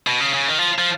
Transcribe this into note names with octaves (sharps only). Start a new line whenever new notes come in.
B2
C#3
C#3
D#3
F3
F3